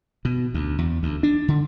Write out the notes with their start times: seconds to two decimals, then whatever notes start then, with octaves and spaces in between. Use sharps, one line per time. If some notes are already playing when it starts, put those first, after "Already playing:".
0.25 B2
0.54 D2
0.78 E2
1.03 D2
1.23 D4
1.48 D3